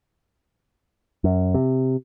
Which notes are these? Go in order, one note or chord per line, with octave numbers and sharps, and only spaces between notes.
F#2
C3